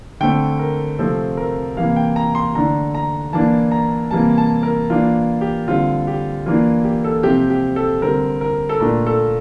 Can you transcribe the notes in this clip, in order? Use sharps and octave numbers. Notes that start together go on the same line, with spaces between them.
D3 A3 C4 G5
A#4
C3 F3 A3 C4 A4
A#4
C3 E3 A#3 F5
G5
A#5
C6
D3 A3 D4 A#5
A#5
E3 A#3 D4 A5
A#5
C3 E3 G3 A#3 A5
A5
A#4
E3 A#3 D4 F4
G4
D3 G3 C4 F4
G4
E3 A#3 D4 F4
G4
A4
C3 F3 C4 G4
G4
A4
D3 G3 C4 A#4
A#4
A4
A#2 A3 D4 A#4
A4